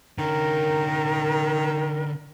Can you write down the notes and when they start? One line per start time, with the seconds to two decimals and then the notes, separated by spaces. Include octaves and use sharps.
0.18 D3 D#3 C#4 A#4